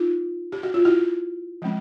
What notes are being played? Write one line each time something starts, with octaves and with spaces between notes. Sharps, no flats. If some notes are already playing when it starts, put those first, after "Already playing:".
Already playing: D#4 F4
G4
F#4
F4
E4 F#4
F3 G#3 C4